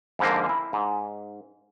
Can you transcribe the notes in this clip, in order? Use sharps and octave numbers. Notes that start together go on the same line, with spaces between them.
F2 G#2 D3 F3 A#3
E4
G#2